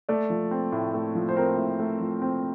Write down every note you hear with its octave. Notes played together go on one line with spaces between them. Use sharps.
A3 D5
F3
C4
A2
A3
F3
C5
C4 A#4
A2
A3
F3
C4